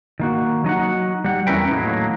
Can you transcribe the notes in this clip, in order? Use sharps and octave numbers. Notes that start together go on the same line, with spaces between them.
D#3 A#3 F#4
F#3 D#4 F#4 F#5
G3 F#5
E2 C#4 E4 A#4 B4 G5
A2 D#3 F#3 A#3